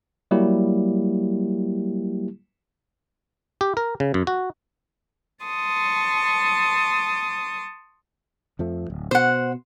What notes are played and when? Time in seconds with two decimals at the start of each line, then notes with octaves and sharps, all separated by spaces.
0.31 F#3 G3 A#3 E4 G4
3.61 G4
3.77 A#4
4.00 C#3
4.14 F#2
4.27 F#4
5.44 A5 C6 C#6 D#6
8.59 F2 F3 A3
8.90 D1
9.11 B2 C5 F#5